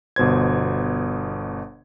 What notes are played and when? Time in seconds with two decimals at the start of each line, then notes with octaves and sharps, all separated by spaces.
0.16 G1 B2 C5 G#6